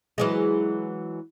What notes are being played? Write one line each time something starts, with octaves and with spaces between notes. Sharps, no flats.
E3 F#3 G#3